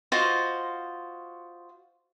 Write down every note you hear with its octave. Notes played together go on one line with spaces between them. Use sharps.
F4 F#4 C5 D#5